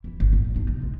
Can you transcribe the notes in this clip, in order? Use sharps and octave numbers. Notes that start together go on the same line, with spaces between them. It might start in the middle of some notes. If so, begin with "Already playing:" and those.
E3 E4
G1
A1 B3
D4 D#4
C3
G#3